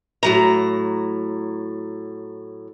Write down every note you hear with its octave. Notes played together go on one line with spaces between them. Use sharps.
A2 F#3 A#5